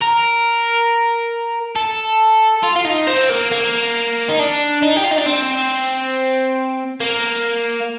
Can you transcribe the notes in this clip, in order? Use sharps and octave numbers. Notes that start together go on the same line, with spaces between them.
A#4
A4
F4
F4
D#4
C4
A#3
A#3
D#4
D4
D#4
G4
F4
D#4
D4
C4
A#3